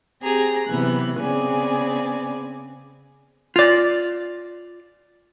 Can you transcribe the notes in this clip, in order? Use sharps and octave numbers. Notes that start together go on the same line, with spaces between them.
C4 G4 G#4 A#5
C3 E3 F#3 B3 F#6
C#3 B3 C4 G#4 D5 G#5
F4 D5